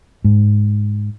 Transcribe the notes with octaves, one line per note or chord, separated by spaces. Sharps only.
G#2